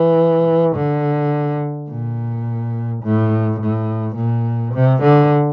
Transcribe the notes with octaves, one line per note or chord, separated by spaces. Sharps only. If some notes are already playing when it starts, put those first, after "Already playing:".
Already playing: E3
D3
A#2
A2
A2
A#2
C3
D3